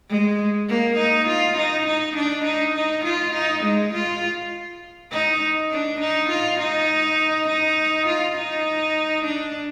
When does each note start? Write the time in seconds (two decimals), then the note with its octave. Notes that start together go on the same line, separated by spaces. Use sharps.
0.09 G#3
0.68 A#3
0.97 D#4
1.27 F4
1.57 D#4
1.86 D#4
2.16 D4
2.45 D#4
2.75 D#4
3.04 F4
3.34 D#4
3.63 G#3
3.93 F4
5.11 D#4
5.71 D4
6.00 D#4
6.29 F4
6.59 D#4
7.48 D#4
8.07 F4
8.36 D#4
9.25 D4